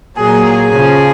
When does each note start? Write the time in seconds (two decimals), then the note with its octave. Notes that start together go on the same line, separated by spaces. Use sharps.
0.17 A#2 F#3 G#4
0.46 G#4
0.75 C#3 F3